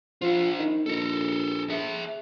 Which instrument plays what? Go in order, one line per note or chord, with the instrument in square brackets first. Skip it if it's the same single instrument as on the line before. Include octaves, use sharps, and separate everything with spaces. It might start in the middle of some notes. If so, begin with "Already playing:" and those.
[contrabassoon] F3 [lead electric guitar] D4 F4
[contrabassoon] D#3
[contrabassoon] A#1 [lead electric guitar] A4 A#4
[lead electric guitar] G#4 E5